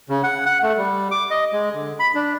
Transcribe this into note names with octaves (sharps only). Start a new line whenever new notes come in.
C#3
F#5
F#5
A3
G3
D6
D#5
G#3
D3
B5
D4